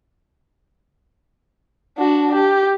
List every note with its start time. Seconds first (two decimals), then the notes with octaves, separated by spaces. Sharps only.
1.98 D4 F#4
2.34 G4